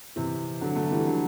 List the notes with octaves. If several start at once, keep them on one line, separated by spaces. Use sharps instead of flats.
C3 E3
D3 F#3
F#3 A3
E3 G3
D3 F#3